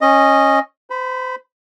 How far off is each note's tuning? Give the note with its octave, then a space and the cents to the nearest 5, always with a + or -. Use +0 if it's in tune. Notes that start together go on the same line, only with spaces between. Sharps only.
C#4 -15 D#5 +0
C5 -35 B5 +0